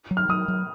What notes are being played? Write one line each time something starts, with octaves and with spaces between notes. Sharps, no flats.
F#3
F6
F#3 D#6
F#3